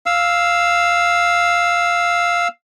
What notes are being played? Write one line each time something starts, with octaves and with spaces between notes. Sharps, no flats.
F5 E6